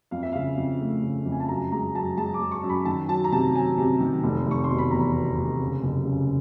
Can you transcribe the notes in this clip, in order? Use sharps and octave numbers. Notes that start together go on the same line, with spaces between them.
F2 F5
E5
C#3 F5
F2
A3
C#3
F2
G#5
A5
F#2 A#5
G#3 A#5
F#2 A5
G#3 A5
D6
G#3
C#6
F#2
B5
D#3 A5
F#3 A5
A#5
C3 A5
F#3 G#5
C3
D#3
F1
F1 C#6
C6
B2
B5
E2 A#5
B2
F1
C#3
F#1
C#3